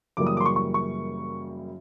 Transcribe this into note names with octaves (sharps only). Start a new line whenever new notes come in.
F#2 C#3 E3 G3 A#3 D6
D#6
D6
C6
C#6
C#6
C#6